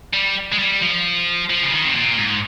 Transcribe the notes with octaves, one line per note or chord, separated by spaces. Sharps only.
G3
G#3
G3
F3
F3
C#3
D#3
C3
A#2
G#2